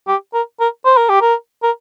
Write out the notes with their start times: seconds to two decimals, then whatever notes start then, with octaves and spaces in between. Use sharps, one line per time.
0.08 G4
0.34 A#4
0.60 A#4
0.85 C5
0.97 A#4
1.09 G4
1.21 A#4
1.63 A#4